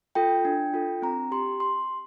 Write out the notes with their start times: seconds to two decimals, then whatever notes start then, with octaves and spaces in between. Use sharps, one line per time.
0.15 F4 A4 G5
0.45 D4
0.74 F4 A4
1.02 C4 A#5
1.32 G4 C6
1.60 C6